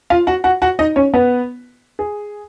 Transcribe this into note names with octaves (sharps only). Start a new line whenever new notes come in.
F4 F5
F#4 F#5
F#4 F#5
F#4 F#5
D#4 D#5
C#4 C#5
B3 B4
G#4